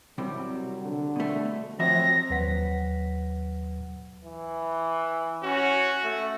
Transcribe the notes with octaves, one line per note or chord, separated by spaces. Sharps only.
C2 C3 F#3 G3
D3
B2 A3
F3 F#3 C4 E5 A#6
D#2 F#3 B4 F#5 B6
E3
C#4 F#4
A3